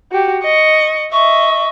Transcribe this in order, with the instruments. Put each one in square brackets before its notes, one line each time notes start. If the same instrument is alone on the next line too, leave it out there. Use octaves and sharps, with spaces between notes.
[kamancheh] F#4 G4
D#5 C#6
[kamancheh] D#5 E5 [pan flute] C#6